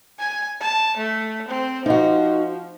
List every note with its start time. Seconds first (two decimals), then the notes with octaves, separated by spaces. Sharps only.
0.19 G#5
0.61 A5
0.97 A3
1.48 C4
1.86 F3 D#4 F#4